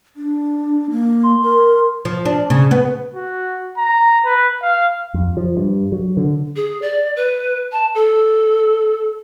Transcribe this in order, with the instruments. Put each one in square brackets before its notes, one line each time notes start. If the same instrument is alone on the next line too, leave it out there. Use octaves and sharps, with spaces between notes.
[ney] D4
A#3
[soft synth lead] C6
[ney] A#4
[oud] F3
D4
C#3
B3
[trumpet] F#4
A#5
B4
F5
[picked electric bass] F2
F3
G2
F#3
D3
[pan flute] G#4
D5
B4
A5
A4